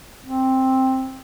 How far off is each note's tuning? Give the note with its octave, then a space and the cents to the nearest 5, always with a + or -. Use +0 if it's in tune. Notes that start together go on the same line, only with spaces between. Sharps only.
C4 +5